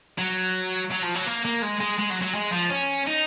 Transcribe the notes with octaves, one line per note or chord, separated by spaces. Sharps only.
F#3
F#3
F3
F#3
A#3
A#3
G#3
G#3
G#3
F#3
F#3
G#3
F3
C#4
D#4